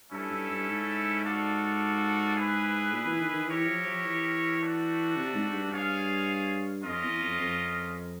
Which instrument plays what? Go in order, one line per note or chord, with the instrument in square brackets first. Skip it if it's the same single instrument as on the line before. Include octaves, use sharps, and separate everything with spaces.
[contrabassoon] G2 [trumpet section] A3 C#4 E4 A4
[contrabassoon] G2
G2
G#2
[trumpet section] D4 F#4 A4 D5 F5
E4 G#4 B4
[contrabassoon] A#2
E3
D#3
D#3
[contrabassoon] E3 [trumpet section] E4 G4 A#4 C#5
[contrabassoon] F3
F3
E3
[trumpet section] A3 D4 F#4
[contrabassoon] C3
G#2
G2
[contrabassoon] G2 [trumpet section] F4 G#4 C#5 F5
[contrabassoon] F2 [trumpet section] C#4 F4 A#4 D#5
[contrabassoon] E2
F2
F2